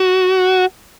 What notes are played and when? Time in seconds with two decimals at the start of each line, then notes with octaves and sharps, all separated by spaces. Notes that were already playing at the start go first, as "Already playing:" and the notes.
Already playing: F#4